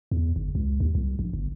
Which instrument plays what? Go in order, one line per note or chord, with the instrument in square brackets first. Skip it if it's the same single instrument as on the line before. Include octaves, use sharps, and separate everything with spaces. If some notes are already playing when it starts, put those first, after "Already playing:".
[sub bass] E2
G1
C#2
D#2
C2
A#1
G1